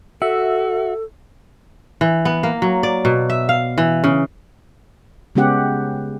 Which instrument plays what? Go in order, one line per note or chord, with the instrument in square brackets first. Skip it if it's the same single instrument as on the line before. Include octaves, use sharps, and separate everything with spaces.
[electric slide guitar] F#4 [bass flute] A4 [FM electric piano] E5
[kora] E3
B3
A#3
F#3
D5
B2
E5
F5
E3
C#3
[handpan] C#3 G#3 B3 C#4 G4 F#5